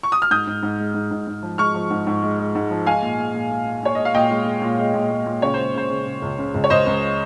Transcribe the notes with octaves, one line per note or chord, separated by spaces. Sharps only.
C#6
D#6
F6
G#2 D#6 G6
G#2
G#2
G#3
G#2
G#2
G#2
F3
G#3 C#6 F6
F3
G#2
G#2
G#3
G#3
G#2
F3
G#3 F5 G#5
A#2
G#3
A#2
G#3
A#2
A#2 C#5
G#3 D#5
F5
A#2 D#5 G5
G#3
G#3
A#2
G#3
A#2
G#3
A#2
C#3 C#5
G#3 C5
C#3 C5
C#3
C#3
C#2
C#3
C#2
C#5
C#2 C5 D#5
C#2